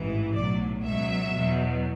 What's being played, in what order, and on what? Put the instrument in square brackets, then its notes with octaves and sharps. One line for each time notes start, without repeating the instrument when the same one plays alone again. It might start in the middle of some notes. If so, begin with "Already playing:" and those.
Already playing: [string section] A1 G#2 E3
B1 A2 F#3 D5
C#2 B2 F#3 E5
E2 B2 F#3